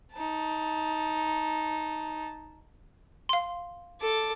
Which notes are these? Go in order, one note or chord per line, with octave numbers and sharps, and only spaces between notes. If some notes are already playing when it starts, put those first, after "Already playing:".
D#4 A5
F5 C6
A4 D6